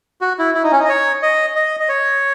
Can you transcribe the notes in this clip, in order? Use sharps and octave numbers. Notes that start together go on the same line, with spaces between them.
F#4
E4
E4
D#4
C#4
D#4
D#5
C#5
D#5
D#5
D#5
C#5